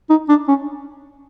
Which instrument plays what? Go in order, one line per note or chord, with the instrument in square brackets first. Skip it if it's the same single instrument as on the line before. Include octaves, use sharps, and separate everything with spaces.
[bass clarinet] D#4
D4
C#4